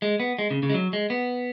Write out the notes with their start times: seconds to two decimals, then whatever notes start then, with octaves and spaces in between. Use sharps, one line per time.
0.02 G#3
0.20 B3
0.39 G#3
0.51 C#3
0.63 C#3
0.70 G#3
0.74 F#3
0.93 G#3
1.10 B3